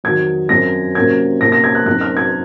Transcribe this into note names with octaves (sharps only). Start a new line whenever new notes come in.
F2 D#3 F#3 G#6
F#2 F3 C4 A#6
C3 F#3 A#3 C#4 G#6
C3 F3 A#3 C#4 A#6
A#6
G#6
F#6
F#2 F3 C4 D#4 F#6
F6
G#6